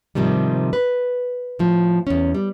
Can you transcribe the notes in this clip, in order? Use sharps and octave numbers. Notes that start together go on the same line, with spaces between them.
G#2 C3 D#3 F3 G3
B4
A2 F3
E2 C#4
G3